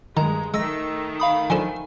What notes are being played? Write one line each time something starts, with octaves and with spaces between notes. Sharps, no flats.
G2 D#3 G#3 A#5
D#3 G#3 A3 E6 A#6
F5 B5 D#6
F3 D4 A4 G#5